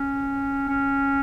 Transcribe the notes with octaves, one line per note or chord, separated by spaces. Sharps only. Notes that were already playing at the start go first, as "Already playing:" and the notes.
Already playing: C#4
C#4